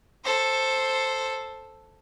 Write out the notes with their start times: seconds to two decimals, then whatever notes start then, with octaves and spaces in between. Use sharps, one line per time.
0.24 A4 C5